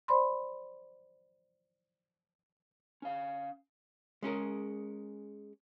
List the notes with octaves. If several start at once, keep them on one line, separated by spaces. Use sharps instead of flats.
C5 D5 B5 C6
C#4 F5
G#3 C#4 G#4 A#4